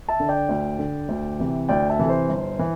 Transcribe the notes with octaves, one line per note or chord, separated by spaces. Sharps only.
E5 A5
D3
D5 G5
D2
D3
D2
C3 E3
D2 D5 G5
E5 A5
C3 E3 A4
C5
G1
E3